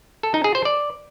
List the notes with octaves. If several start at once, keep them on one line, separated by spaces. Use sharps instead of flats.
A4
D#4
G#4
C5
D5